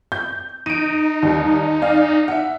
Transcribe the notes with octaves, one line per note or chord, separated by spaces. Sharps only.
G6
D#4 D7 D#7
D#2 G3
D5 F5 G#5
E5 F#5